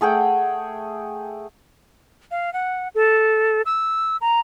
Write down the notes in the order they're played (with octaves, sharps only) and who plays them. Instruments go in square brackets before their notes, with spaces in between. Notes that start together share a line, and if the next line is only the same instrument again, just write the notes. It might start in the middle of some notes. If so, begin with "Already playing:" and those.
[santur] A3 G#4 F#5 G5
[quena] F5
F#5
A4
E6
A#5